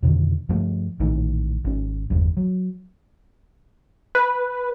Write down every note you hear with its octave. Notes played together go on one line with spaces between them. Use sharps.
F2 B2 D3 D#3
G2 F3 A3
A#1 A2 D#3 E3
G#1 C#4
G1 E2 G2
F#3
B4